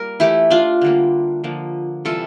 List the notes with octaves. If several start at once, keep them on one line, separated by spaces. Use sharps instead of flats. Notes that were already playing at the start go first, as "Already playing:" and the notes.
Already playing: G3 A#3 A#4
E3 A3 E4 G4
D4 F4
D3 G3 A#3
D3 F3 A#3
C3 E3 G3 F4 A4